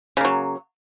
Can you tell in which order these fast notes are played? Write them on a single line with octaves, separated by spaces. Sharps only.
C#3 A#3 F#3